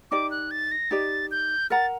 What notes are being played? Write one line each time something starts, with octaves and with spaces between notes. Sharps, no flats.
D#4 G4 D5 D6
F#6
A6
A#6
D#4 G4 D5 A6
G6
A#4 F#5 A#5 A6